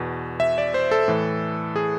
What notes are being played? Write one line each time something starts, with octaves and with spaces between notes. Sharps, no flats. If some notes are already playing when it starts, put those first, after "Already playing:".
Already playing: E2 B2
E5
D5
C5
A4
A2 E3
G#4